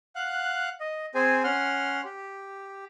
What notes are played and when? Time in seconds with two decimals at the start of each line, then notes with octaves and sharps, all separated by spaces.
0.16 F5 F#5 F#6
0.80 D#5
1.15 C4 G#4 C5 G#5
1.44 C#4 F#5 C6 F6
2.05 G4